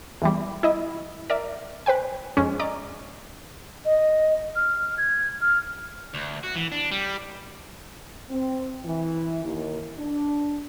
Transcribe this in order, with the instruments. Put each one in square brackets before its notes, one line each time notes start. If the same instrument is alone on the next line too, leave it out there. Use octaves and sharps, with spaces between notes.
[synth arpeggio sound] E2 E3 G3
E4 D#5 E5
A#4 D5 E5
B4 C5 G5 G#5
F2 G#3 C#4
D5 D#5 A#5 D6
[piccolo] D#5
F6
G#6
F6
[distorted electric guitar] D2
F#4
E3
D4
G3
[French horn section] C4
E3
D#2
D4